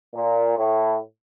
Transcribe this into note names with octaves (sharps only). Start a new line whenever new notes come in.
A#2
A2